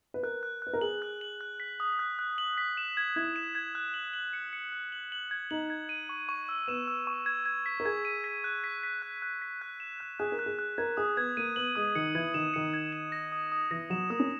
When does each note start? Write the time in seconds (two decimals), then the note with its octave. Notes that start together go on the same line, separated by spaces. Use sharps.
0.14 B4
0.23 A#4 F#6
0.43 F#6
0.62 B4 F#6
0.73 A#4
0.81 G#4 F#7
1.02 F#6
1.21 F#7
1.41 F#6
1.60 B6
1.80 D#6
1.99 F#6
2.19 F#6
2.38 F#7
2.58 B6
2.77 E7
2.97 G#6
3.16 E4 G#6
3.36 E7
3.55 G#6
3.75 F#6
3.94 F#7
4.14 F#7
4.33 C#7
4.53 C#7
4.72 F#6
4.92 F#7
5.12 F#7
5.31 G#6
5.51 D#4 F#7
5.70 G#6
5.89 D#7
6.09 C#6
6.29 C#6
6.49 E6
6.68 B3 E7
6.88 E6
7.07 C#6
7.26 G#6
7.46 G#6
7.66 B6
7.80 A#4
7.85 G#4 G#6
8.05 D#7
8.24 B6
8.44 F#6
8.64 B6
8.83 B6
9.02 F#6
9.22 F#6
9.42 B6
9.62 F#6
9.80 E7
10.00 F#6
10.19 G#4 F#6
10.32 A#4
10.39 F#6
10.46 G#4
10.59 F#6
10.78 A#4 G#6
10.97 G#4 D#6
11.17 B3 G#6
11.37 A#3 D#7
11.56 B3 F#7
11.76 G#3 D#6
11.95 D#3 C#7
12.15 E3 G#6
12.34 D#3 E7
12.54 D#3 C#7
12.73 G#6
12.93 E7
13.12 A#6
13.32 D#6
13.52 D#6
13.71 E3 A#6
13.90 F#3 E7
14.10 A#3 D#6
14.20 C#4